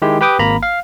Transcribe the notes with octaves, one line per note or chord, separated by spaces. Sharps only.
D#3 G#3 E4 G4
G4 B4 G5 D6 D#6
G#1 A#3 A#5 B5
F5